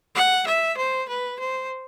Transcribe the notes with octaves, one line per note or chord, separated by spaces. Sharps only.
F#5
E5
C5
B4
C5